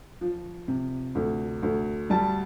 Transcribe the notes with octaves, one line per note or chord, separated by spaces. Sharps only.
F3
C3
D2
D2
G3 A5